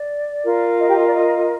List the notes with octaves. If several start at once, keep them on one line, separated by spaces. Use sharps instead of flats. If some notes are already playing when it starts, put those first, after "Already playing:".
Already playing: D5
F4 A#4
D#5
G4 G5
D#5
D5
D#5